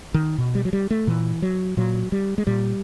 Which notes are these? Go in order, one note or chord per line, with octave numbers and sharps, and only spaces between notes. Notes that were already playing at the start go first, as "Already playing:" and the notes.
D#3
B2
G3
F#3
G3
A3
A#2 E3
F#3
A#2 F#3
G3
G#3
A#2 G3